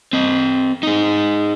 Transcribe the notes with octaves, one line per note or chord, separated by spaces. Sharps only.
C4 D#5
D#4 G#4